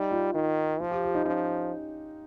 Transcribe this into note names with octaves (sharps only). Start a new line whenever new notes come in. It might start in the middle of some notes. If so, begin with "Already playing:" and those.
Already playing: G3 D#4
F4
D#3 D#4
F3 F4
G4
G4
D#4
F3 C#4